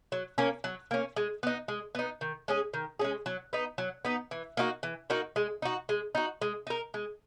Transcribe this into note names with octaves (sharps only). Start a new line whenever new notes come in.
F#3
A#3 C#4
F#3
A#3 C#4
G#3
B3 D#4
G#3
B3 D#4
D#3
G#3 C#4 G#4
D#3
G#3 C#4 G#4
F#3
B3 D#4
F#3
B3 D#4
E3
A#3 D#4 F#4
E3
A#3 D#4 F#4
G#3
D#4 F#4
G#3
D#4 F#4
G#3
D#4 A#4
G#3